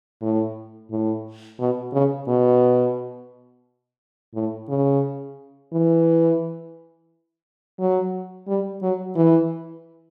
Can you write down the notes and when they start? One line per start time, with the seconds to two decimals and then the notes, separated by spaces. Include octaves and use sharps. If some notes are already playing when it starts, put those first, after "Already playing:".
0.22 A2
0.90 A2
1.59 B2
1.93 C#3
2.28 B2
4.34 A2
4.69 C#3
5.73 E3
7.80 F#3
8.48 G3
8.82 F#3
9.16 E3